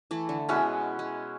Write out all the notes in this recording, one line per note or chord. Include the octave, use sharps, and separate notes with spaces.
E3 A3
D3
B2 G#3 C#4 E4 E5 F#5
G#3